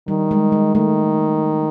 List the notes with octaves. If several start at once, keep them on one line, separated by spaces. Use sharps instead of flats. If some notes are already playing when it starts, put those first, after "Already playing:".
D#3 G3
G#3
G#3
D#3 A3